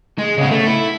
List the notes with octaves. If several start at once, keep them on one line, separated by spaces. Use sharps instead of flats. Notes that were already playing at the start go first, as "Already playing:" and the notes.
G#3
C#3 B3
A3
E4